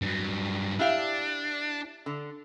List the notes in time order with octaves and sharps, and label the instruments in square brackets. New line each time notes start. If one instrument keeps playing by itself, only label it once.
[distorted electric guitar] G2 F#3
[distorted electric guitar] D4 [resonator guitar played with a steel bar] E4 G4 F5
[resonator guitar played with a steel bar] D3